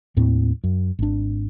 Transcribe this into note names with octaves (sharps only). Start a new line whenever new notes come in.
D#2 A2 C4
F#2
G#1 D4